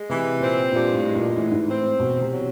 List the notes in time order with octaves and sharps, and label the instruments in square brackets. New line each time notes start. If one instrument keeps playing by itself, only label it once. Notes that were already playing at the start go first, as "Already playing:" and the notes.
Already playing: [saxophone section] G#3
[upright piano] C3 [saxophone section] E3
[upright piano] A#2 [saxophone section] C4
[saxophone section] G2 [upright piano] A#2
[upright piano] A2
[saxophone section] G#3
[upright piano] A#2
[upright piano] A2 [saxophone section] E3
[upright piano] G#2
[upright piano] A2 [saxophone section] C4
[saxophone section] E2 [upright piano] B2
[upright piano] C3
[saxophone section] F#3